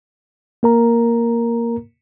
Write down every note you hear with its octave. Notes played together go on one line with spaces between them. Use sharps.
A#3 A#4 A#5